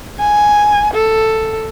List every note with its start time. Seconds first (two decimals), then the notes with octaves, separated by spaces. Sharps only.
0.20 G#5
0.94 A4